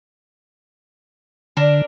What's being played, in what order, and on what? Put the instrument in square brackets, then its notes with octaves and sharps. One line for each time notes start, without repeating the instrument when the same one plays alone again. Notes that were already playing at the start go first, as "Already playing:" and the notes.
[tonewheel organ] D3 [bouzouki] D4 A#4